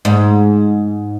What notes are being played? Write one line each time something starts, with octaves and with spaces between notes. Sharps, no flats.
G#2